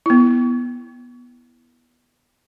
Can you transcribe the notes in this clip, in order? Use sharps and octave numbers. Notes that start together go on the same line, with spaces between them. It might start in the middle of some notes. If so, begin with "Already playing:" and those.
B3 E4